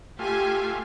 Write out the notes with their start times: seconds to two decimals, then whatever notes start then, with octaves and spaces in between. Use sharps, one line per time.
0.19 A3 F4 G4 G#5